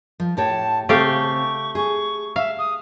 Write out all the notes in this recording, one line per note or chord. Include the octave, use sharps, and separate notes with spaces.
F3
A2 G4 C#5 A5
C#3 A3 C4 G4 F5 C#6
G#4 C#6
E5 F5
D#6